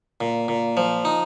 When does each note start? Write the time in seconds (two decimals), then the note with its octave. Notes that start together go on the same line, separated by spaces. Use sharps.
0.21 A#2
0.48 A#2
0.77 F3
1.05 D#4